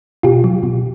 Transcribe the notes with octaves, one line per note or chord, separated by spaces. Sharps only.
B2 F4 G4
F#3
B2